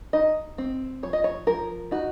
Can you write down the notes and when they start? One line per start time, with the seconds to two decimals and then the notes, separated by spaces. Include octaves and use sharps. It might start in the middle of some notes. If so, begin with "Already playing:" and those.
0.13 D#4 D#5
0.58 C4
1.03 F3 C#5
1.13 D#5
1.24 C#5
1.47 F3 A#4
1.91 D#4 F#4